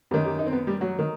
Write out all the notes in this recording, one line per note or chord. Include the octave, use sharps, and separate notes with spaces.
F#2 D#3 G4
G4
D#4
C4
B3
G3
F#3
D#3